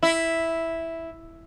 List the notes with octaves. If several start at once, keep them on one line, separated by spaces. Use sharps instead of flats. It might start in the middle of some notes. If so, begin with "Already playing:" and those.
E4